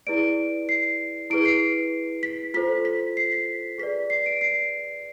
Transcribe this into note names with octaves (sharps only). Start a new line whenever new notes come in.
E4 G#4 B4 D5 D7
C7
E4 G#4 B4 D7
C7
B6
F4 A4 C5 B6
B6
C7
B6
G#4 B4 D5 B6
C7
D7
C7